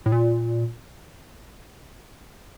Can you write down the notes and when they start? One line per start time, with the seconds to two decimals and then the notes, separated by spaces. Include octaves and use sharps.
0.06 A2
0.12 A#2